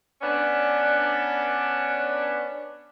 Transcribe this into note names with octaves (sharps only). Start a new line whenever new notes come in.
B3 C#4 D4